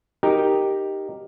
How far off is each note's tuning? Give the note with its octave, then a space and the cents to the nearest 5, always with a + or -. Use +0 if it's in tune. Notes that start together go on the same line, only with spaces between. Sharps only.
D#4 +0 G4 +0 A#4 +0